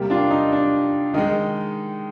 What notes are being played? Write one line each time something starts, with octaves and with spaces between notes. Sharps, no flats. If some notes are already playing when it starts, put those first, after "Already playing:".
Already playing: C3 G3 A#3
D4 F4
D#4
D4
D#3 G#3 D#4